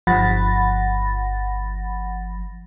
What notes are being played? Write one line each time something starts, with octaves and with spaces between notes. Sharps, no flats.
G1 F3 F#5 B5 A6 A#6